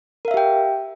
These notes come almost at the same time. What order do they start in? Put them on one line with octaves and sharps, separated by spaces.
A#4 F5 E5 G4 G5